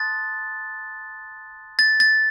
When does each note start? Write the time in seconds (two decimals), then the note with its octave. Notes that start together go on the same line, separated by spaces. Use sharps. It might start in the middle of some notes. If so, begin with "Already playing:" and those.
Already playing: A5 C6 D#6 F#6 A6
1.79 A6
2.00 A6